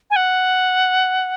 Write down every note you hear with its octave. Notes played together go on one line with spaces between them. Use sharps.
G#5
F#5